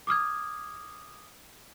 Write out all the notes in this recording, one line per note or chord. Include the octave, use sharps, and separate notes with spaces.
D6 D#6 F6 G#6